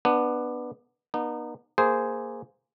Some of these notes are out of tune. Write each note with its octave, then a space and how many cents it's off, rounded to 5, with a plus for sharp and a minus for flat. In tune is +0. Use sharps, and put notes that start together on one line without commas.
B3 +0 D4 +20
B3 -40 D#4 -35
A#3 +0 G#4 +0 C5 -10